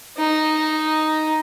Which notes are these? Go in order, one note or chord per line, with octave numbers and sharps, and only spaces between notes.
D#4